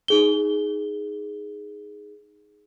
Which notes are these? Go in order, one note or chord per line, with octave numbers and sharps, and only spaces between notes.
D#4 G#4 G7